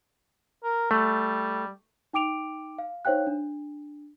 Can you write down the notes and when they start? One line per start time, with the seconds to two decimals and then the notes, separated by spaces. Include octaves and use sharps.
0.64 A#4
0.91 G3 A3
2.13 D#4 G5 D6 D7 F7
2.78 F5
3.05 D#4 C5 C#5 F5 G5 F#6
3.27 D4